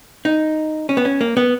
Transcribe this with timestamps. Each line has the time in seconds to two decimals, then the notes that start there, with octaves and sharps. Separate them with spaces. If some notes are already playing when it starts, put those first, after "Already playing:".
0.25 D#4
0.89 C#4
0.97 B3
1.05 C#4
1.21 A#3
1.37 B3